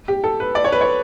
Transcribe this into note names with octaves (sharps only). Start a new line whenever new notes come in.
G4
A4
B4
D5
C#5
B4
C#5